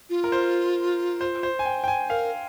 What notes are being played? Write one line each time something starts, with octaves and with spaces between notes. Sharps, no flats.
F4
A#4
C5
C5
C5
G#5
G5
G5
G#5
A#4 F5